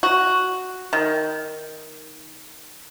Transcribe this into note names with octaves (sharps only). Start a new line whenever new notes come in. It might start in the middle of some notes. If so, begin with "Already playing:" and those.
F#4
D#3